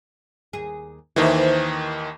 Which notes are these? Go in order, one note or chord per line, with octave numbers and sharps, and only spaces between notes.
D#2 G#4
D#2 D#3 E3 E4 C5